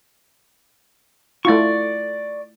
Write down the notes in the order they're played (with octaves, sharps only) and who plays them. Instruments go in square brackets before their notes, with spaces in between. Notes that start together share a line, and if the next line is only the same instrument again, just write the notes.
[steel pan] A3 E4 F4 [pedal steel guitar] D5 C#6